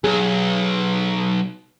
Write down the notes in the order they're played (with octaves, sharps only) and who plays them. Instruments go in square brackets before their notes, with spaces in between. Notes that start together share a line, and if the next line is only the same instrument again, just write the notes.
[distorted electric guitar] B1 [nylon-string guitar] G#4